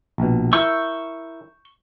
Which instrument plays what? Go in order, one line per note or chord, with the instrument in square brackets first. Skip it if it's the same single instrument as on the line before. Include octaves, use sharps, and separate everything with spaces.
[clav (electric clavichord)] A#1 B2
[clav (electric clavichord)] E4 A#4 E5 [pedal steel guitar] C#6 E6 G6